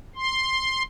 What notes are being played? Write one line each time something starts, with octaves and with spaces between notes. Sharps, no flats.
C6